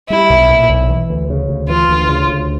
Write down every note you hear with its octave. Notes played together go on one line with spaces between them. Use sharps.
G3 E4
B1
A#2
B1
E3
D2
C#3
D2
E3 F4
D2
C#3
D2